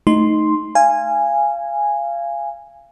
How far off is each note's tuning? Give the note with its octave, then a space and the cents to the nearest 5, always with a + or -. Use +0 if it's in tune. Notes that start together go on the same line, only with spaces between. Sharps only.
A3 +0 D#4 +0 C6 +0
F5 -25 G#5 -10